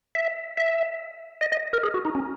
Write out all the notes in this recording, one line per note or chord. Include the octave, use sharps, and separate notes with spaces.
E5
E5
D#5
D#5
A#4
G#4
F#4
D#4
C#4